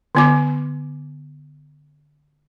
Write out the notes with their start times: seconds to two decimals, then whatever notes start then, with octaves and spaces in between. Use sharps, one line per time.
0.15 D3 B3 D6